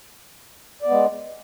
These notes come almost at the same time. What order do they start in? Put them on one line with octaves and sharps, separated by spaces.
D5 B3 G#3